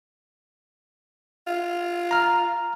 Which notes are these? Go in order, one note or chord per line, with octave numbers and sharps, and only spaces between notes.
F4
A#5 F6